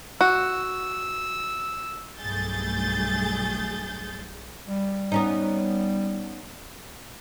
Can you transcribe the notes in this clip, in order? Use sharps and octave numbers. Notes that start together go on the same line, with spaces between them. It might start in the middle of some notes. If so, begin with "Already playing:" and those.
F#4 E6
B1 G2 A3 G#4 G6 A6
G3
B3 C#4 D#4